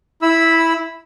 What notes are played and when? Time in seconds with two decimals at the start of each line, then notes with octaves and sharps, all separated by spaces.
0.22 E4 B5 E6